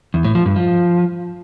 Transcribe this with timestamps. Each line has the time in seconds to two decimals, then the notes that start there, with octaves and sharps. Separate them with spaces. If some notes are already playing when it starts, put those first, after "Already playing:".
0.14 E2
0.24 A2
0.35 F3
0.46 G2
0.56 F3